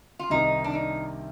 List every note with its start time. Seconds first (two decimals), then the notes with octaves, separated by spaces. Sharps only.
0.19 F4
0.30 C2 C3 D#3 D#4
0.64 D4
0.74 D#4